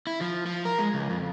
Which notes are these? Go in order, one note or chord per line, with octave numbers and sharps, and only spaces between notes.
E4
F3
F3
A#4
G#3
C#2
F2